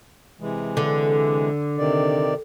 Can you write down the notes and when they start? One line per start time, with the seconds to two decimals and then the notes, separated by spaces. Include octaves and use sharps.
0.40 C3 E3 G#3
0.77 D3
1.78 C3 D#3 D5